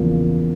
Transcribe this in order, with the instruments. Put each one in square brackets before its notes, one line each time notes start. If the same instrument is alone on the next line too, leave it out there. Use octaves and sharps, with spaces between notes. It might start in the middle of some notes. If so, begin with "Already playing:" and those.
Already playing: [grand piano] E2 C#3 F3 A#3